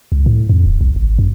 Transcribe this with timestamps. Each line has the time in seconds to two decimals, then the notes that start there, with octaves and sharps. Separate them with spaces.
0.12 C#2
0.26 A2
0.49 F2
0.66 D1
0.81 B1
0.96 G#1
1.19 F#2